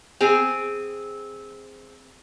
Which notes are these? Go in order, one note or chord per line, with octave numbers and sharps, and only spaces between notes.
C4 G#4